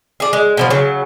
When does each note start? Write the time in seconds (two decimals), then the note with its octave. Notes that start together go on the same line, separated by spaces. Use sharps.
0.20 G#4 D5
0.33 G#3
0.57 B2 D3 F3
0.70 C#3 F#3